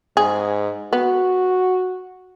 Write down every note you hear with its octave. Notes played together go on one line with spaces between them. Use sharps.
G#2 G#4
B3 F#4